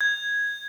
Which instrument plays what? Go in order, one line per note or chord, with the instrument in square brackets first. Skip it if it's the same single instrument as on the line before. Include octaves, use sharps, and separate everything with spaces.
[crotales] G#6